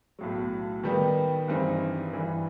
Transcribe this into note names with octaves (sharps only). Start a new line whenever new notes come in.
B1 A2 F#3
D#3 G3 B3 D#4 G4
G2 E3 G3 C4 D#4
G2 E3 G3